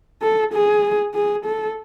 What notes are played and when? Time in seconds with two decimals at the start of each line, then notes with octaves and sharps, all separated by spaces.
0.22 A4
0.53 G#4
1.14 G#4
1.45 A4